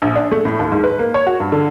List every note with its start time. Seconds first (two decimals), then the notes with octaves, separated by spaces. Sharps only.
0.02 A#1
0.16 D4
0.31 A3
0.45 A2
0.59 D#2
0.72 G#2
0.84 B4
0.99 A#3
1.14 C#5
1.27 F#4
1.40 G2
1.52 D3